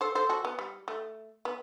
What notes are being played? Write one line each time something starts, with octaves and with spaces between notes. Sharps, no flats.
A4 C5
A4 C5
F#4 A4
B3
G3
A3
B3